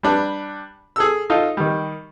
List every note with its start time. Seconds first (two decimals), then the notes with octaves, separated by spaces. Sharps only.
0.03 G3 D4 B4
0.96 G#4 A4 E6
1.30 D#4 F4 A4
1.57 D#3 G3